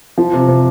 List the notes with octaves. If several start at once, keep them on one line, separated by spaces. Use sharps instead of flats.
F3
C3
C3